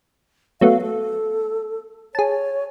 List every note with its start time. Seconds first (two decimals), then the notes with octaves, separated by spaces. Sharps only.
0.61 F#3 A3 B3 F5
0.81 A4
2.15 G#4 C#5 A5